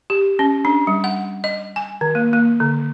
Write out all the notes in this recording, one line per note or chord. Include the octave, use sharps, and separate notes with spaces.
G4
C#4
D4
G3
F#5
D#5
G#5
D#3
A#3
A#3
D3